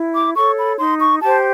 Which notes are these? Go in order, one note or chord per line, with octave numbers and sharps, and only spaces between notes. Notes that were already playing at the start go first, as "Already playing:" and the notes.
Already playing: E4
D6
A4 C#5 C#6
B5
D#4 C6
C#6
G4 C5 A5